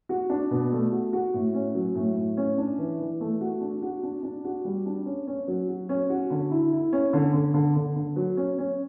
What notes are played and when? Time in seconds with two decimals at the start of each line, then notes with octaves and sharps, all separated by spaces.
0.09 F#4
0.30 D4
0.51 B2
0.72 A3
0.92 F#4
1.13 F#4
1.34 A2
1.54 C#4
1.75 F#3
1.95 A2
2.16 A2
2.37 C#4
2.58 D4
2.78 E3
3.00 E3
3.20 A3
3.41 F#4
3.61 D4
3.82 F#4
4.03 D4
4.23 D4
4.44 F#4
4.65 G3
4.86 D4
5.06 C#4
5.27 C#4
5.48 F#3
5.68 F#4
5.89 C#4
6.10 F#4
6.30 D3
6.51 E4
6.72 E4
6.93 C#4
7.13 D3
7.34 D3
7.54 D3
7.76 D3
7.96 D3
8.16 F#3
8.37 C#4
8.58 C#4